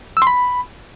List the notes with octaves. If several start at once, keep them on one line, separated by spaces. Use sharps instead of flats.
E6
C6
B5